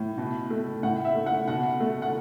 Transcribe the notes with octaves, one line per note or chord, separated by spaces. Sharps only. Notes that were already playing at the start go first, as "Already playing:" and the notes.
Already playing: A2
B2
A3
A2 F#5
E5
A3
F#5
B2 F#5
A3
F#5